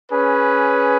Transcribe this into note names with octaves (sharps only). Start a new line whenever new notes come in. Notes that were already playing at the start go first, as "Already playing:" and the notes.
C#4 G#4 B4